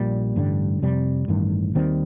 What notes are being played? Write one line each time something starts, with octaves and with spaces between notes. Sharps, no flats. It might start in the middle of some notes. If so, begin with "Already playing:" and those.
Already playing: A#1 A#2 G3
A1 G2 D3 G3
F2 C3 G3
A1 G2 D#3
D#2 D#3 G3 C4